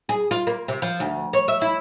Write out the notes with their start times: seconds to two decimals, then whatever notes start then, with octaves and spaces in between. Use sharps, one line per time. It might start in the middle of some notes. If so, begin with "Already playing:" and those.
0.09 G#4
0.31 F4
0.47 A#3
0.68 C3
0.82 F3
1.00 D2
1.33 C#5
1.48 E5
1.61 E4